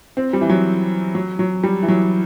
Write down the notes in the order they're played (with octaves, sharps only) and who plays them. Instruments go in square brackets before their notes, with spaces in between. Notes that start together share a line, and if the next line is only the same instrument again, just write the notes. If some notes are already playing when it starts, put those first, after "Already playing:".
[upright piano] C4
G3
E3
F#3
F#3
F#3
G3
E3
F#3